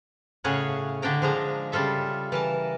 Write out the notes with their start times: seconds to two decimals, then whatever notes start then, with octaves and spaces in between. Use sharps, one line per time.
0.44 A2 C#3 G#4 C#5 F5 F#5
1.02 A2 D3 D4 G5 A#5
1.22 F3 G#3 A#5
1.72 C#3 G3 F4 A4 E5
2.32 E3 A#4 A5